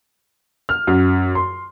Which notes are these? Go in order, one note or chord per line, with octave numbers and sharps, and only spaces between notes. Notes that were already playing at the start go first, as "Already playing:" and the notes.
F6
F#2
C6